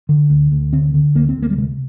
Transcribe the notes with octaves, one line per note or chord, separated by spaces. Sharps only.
D3
D2
D2
D3 C4
D3
D2 A#3
C4
D2
A#3
G3
C3 G#3